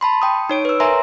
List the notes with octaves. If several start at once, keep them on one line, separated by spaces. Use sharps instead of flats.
A5 B5 C6
G5 D#6
D#4 C#5 D7
B4 E6
A#4 C#5 E5 G#5 A#5 C6